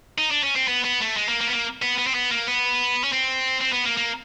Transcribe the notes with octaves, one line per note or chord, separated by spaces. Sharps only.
D#4
D4
C#4
C4
B3
B3
A3
G#3
A#3
A#3
B3
A#3
B3
B3
C4
B3
A#3
B3
C#4
C4
C4
B3
A#3
A#3